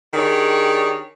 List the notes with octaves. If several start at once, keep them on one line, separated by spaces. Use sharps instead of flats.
D#3 D4 G4 G#4 C#5 D5